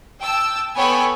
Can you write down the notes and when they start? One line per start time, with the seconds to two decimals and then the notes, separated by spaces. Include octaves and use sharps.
0.22 G5 A5 E6
0.77 B3 A4 C#5 G5 G#5 B5